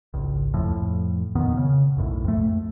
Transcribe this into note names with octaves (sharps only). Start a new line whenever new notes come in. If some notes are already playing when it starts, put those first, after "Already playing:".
G#1 C#2
F2 A2 F3
F2 A#2 D#3 B3
C#3
B1 F#2 A2
F2 A3